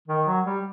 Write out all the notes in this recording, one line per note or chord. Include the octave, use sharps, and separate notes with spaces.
D#3
F#3
G3